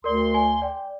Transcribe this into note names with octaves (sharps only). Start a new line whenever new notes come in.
D2 A#4 D5 C6
G#5
D5 G5